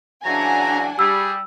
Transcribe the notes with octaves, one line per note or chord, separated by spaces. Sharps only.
C#3 E3 F#3 D4 F#5 G#5 A#5
G3 G#4 E6